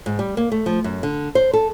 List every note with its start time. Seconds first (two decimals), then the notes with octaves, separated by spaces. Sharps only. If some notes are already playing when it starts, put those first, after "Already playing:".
0.06 G#2
0.19 G3
0.37 A#3
0.52 A3
0.66 F3
0.84 F#2
1.03 D3
1.35 C5
1.53 A4